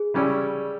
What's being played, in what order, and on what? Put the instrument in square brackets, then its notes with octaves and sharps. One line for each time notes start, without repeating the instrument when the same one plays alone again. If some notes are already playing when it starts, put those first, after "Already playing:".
Already playing: [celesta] G#4
[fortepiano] C#3 G3 C#4 E4 G4